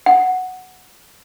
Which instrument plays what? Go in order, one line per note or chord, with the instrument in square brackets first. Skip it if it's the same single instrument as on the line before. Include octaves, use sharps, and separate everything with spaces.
[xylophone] F#5